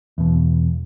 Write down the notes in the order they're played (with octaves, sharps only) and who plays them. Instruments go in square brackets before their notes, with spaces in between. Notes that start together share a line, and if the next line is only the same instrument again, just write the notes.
[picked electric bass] E2 B2